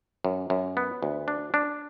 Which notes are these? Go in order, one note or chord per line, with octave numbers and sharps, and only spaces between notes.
F#2
F#2
B3
D2
D4
D4